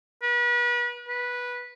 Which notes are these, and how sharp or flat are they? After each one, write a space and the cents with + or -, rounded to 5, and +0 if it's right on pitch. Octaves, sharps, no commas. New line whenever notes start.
B4 -35
B4 -10